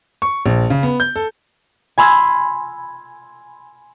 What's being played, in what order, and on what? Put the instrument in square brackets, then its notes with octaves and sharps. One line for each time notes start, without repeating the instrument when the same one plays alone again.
[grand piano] C#6
A#1
C#3
B3
G6
A4
[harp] G#5 B5 C6 E6 F6 G#6